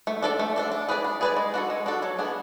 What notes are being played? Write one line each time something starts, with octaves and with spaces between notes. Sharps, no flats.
A3
D4 A4 D5
A3
D4 A4 D5
D4
G#4 B4 D5
D4
G#4 B4 D5
G#3
D4 F#4 A4
G#3
D4 F#4 A4
F#3
B3 D4 G#4